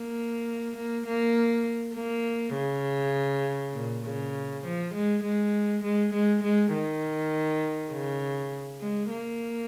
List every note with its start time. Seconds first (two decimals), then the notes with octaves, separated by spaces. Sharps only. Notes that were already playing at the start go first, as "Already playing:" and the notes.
Already playing: A#3
0.76 A#3
1.06 A#3
1.95 A#3
2.55 C#3
3.74 A#2
4.04 C#3
4.64 F3
4.94 G#3
5.23 G#3
5.83 G#3
6.13 G#3
6.43 G#3
6.73 D#3
7.92 C#3
8.81 G#3
9.11 A#3